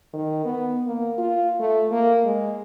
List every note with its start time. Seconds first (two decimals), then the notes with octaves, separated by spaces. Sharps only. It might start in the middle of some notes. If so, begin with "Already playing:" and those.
0.13 D#3
0.45 B3
0.87 A#3
1.18 F4
1.60 A3
1.91 A#3
2.25 G#3